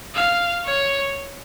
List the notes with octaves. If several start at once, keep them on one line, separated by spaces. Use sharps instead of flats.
F5
C#5